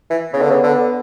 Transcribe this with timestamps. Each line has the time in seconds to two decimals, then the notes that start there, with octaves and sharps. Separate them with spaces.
0.10 E3
0.33 C#3 B3
0.42 D3
0.51 C#3
0.63 D3